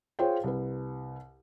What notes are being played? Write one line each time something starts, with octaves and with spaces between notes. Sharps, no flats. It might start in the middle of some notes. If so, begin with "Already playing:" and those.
F4 G#4 C5 C#5 F5 G5
C2 B4